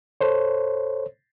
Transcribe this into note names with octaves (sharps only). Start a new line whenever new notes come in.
A4 C5 C#5